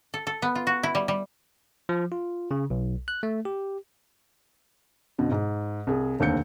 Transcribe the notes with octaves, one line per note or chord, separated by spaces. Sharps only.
A4
A4
B3
F4
F#4
E4
G3
G3
F3
F4
C#3
B1
F#6
A3
G4
F2 B2 D3
G#2
C2 G#4
F1 D#2 D3 C4 G6 C#7